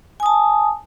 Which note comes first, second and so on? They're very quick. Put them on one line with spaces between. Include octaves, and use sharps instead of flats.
G#5 D#6 A5